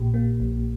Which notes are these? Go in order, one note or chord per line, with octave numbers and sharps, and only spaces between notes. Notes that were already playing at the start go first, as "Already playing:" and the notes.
Already playing: A#1 A#2 G4
A#3
A#1